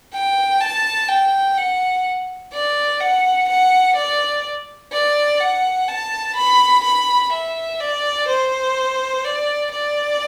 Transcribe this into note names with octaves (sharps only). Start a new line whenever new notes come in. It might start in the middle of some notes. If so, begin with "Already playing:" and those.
G5
A5
G5
F#5
D5
F#5
F#5
D5
D5
F#5
A5
B5
B5
E5
D5
C5
D5
D5